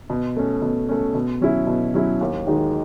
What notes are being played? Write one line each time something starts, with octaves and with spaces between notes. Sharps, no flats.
B2
A3 C#4
B2
A3 C#4
B2
F#3 C#4 E4
B2
F#3 C#4 E4
D#2
D#3 G#3 D#4 F#4